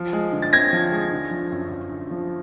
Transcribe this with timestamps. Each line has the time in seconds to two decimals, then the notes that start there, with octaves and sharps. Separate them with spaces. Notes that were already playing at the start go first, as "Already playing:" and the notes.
Already playing: F3
0.13 G#3
0.32 D3
0.42 A6
0.53 C4 G#6 A#6
0.73 F3
0.92 G#3
1.12 D3
1.31 F3
1.52 F#2
1.71 F#2
1.91 D3
2.11 F3